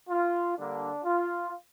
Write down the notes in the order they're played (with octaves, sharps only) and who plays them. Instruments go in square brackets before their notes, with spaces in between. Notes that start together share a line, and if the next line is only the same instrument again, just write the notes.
[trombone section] F4
D3 G3 A#3 D4
F4